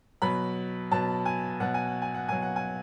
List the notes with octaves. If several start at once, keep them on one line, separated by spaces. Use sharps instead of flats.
B2 F#3 B5
B2 F#3 A5
G#5
B2 F#3 F#5
G#5
F#5
G#5
F#5
B2 F#3 G#5
F#5
G#5